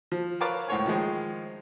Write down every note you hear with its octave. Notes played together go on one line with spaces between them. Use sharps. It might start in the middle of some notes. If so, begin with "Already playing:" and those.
F3
A#4 B4 C#5 F5 A5 D6
C#2 A2 C5 C#5 G#5
D#3 F3 G#3